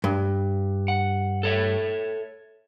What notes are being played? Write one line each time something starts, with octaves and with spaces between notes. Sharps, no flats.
G2
F#5
A4 C#5 E5